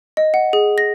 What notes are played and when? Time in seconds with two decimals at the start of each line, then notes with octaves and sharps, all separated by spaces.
0.17 D#5
0.34 F#5
0.53 G#4
0.78 A#6